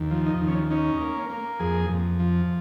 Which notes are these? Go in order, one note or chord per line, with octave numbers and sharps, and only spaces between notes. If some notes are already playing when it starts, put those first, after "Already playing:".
Already playing: D#2
F3
D#4
D#2
C#4
C#4 D#4
A#3
A#3
F2 G#4
F2
F3